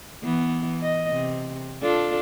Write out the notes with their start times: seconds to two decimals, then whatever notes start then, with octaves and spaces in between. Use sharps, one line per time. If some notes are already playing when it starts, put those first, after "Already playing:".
0.23 E3 B3
0.82 D#5
1.11 C3
1.83 D4 F4 A4